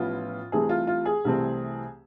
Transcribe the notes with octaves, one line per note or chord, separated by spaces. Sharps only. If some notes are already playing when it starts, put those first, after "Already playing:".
Already playing: A1 A2 F3 B3 F4
C2 C3 E3 A3 C4 G#4
F4
F4
G#4
C2 C3 E3 A3 C4